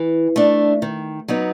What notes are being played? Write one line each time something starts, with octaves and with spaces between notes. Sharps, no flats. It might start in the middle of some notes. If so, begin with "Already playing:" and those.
Already playing: E3
A3 D4
D#3
F#3 B3 D#4